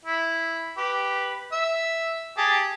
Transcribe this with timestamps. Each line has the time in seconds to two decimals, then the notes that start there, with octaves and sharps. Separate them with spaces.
0.05 E4
0.78 G4 B4
1.52 E5
2.37 G4 G#4 A5